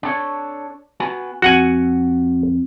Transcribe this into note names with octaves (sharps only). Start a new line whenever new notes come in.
D4 A4 C#5
B3 F#4 G#5
F2 F#4 F#5 G#5